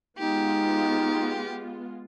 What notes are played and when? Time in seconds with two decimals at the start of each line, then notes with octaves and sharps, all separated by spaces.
0.18 G#3 B3 D#4 F4 G4